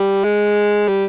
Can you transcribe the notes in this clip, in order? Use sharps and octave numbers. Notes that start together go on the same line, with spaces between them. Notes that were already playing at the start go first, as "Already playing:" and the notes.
Already playing: G3
G#3
G3